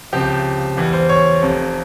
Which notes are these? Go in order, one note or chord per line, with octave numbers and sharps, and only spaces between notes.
C#2 C3 F3 G4
E2 E3 G3
C5
C#5
F1 F2 C3